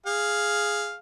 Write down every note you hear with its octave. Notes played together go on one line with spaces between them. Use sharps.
G#4 F5